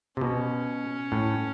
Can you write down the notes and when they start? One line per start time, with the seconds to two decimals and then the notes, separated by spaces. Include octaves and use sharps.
0.17 C3
0.21 B2 C#4
1.12 A2